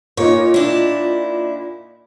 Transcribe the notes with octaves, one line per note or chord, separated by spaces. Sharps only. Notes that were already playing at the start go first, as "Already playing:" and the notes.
A#2 A#3 D#4 C#5
D4 E4